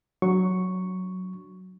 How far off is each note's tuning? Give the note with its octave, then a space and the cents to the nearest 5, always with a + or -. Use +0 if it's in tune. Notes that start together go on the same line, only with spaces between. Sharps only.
F#3 +0 D4 +0 C#6 +0